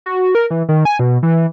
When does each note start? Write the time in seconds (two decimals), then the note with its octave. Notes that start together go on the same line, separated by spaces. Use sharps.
0.06 F#4
0.35 A#4
0.51 E3
0.69 D#3
0.85 G#5
0.99 B2
1.23 E3